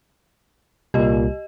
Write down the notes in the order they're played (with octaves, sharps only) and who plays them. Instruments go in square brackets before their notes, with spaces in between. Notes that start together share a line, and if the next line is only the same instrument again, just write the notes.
[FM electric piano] C2 [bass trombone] A#2 [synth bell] G4 D#5